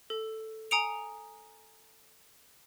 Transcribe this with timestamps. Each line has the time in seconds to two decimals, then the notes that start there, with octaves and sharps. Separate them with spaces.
0.10 A4
0.71 G#5 A#5 D#6 C#7 D7 F7